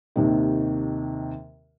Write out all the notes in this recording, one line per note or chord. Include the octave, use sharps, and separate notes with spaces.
D#2 C3 D#3